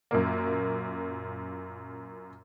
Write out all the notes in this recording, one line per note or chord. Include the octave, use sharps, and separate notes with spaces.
F#2 A#2 A#3